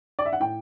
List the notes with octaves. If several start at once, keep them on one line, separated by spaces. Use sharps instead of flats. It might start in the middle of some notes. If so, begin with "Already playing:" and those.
D5
E5
F#5
A2 G5